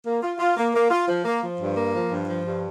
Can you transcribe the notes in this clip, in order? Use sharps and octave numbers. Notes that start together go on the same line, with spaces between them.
A#3
F4
F4
A#3
A#3
F4
F3
A#3
F3
G2
A#3
F3
G2
F3
G2